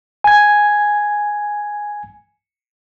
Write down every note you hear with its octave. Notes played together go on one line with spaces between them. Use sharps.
G#5 G#6